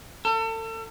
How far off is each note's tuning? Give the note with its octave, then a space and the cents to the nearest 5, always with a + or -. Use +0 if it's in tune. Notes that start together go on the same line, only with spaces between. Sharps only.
A4 +35